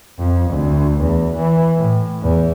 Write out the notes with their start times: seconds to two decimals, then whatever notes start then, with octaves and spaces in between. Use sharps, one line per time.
0.19 F2
0.50 D2
1.00 E2
1.36 E3
1.77 A2
2.22 E2